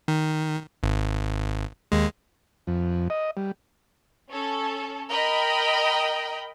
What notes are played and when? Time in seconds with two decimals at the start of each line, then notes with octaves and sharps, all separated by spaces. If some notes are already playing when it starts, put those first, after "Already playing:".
0.08 D#3
0.83 G#1
1.92 D#2 G#3
2.67 F2
3.10 D#5
3.37 G3
4.29 C#4 A4
5.10 A#4 D#5 G5 B5